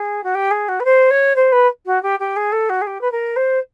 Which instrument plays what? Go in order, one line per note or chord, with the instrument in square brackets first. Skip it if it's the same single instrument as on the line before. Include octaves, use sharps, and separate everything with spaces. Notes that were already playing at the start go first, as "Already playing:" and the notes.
Already playing: [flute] G#4
F#4
G4
G#4
F#4
B4
C5
C#5
C5
B4
F#4
G4
G4
G#4
A4
F#4
G#4
G4
B4
A#4
C5